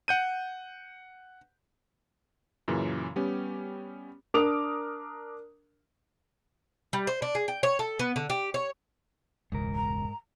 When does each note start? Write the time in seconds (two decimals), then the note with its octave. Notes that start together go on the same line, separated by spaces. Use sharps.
0.08 F#5 G6 D#7
2.68 F#2 A#2 C#3 E3
3.16 G3 B3 C#4 G4
4.34 D4 A#4 D6 D#6 F7
6.93 G3
7.07 C5
7.22 D4
7.35 G#4
7.48 G5
7.63 C#5
7.79 A4
7.99 B3
8.16 D3
8.30 G4
8.54 C#5
9.52 E1 C#2 G#2 A#4
9.75 A#5